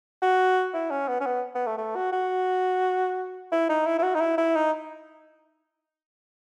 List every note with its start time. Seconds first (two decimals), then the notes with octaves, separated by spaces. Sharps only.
0.22 F#4
0.74 E4
0.91 C#4
1.08 B3
1.21 C#4
1.26 B3
1.55 B3
1.67 A3
1.78 A3
1.96 F#4
2.12 F#4
3.52 E4
3.69 D#4
3.86 E4
3.99 E4
4.03 F#4
4.15 D#4
4.20 E4
4.38 E4
4.56 D#4